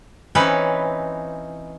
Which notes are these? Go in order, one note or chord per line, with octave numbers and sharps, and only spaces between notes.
E3 C4 C#4 D#4 B4